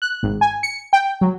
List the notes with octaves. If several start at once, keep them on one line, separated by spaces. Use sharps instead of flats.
F#6
G#1
G#5
C#7
G5
F#3